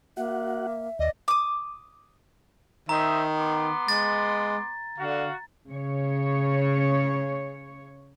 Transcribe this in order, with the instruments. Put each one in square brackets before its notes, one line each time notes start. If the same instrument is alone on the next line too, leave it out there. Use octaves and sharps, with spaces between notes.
[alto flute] A#3 [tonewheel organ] F#4 F#5 [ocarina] E5
[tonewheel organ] D#2 [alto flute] D5 [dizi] D#5
[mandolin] D6 D#6
[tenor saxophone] D#3 [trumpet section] C5 D#5 E5 [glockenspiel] A#5
[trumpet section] B3 C6 D6
[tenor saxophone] G#3 [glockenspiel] A6
[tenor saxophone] D3 [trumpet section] F#4 F5
[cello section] C#3 C#5